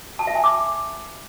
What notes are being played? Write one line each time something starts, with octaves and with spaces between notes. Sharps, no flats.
A5
E5
G#5
D6